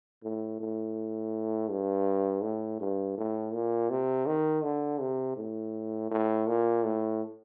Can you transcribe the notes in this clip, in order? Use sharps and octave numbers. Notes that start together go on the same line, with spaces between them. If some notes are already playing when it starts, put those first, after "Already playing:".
A2
A2
G2
A2
G2
A2
A#2
C3
D#3
D3
C3
A2
A2
A#2
A2